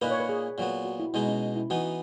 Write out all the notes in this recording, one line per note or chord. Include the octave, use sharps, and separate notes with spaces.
A#2 A#3 D#4 B4
C#5
B4
G#4
A#2 F#3 B3
F#4
E4
B2 G#3 D#4 E4
C#4
E4
E3 B3 D#4 F#4